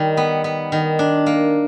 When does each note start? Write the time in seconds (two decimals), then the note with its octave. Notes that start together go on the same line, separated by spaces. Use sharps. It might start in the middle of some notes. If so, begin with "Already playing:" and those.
Already playing: D#3 G3
0.17 B3
0.44 B3
0.72 D#3
0.99 D4
1.26 A#3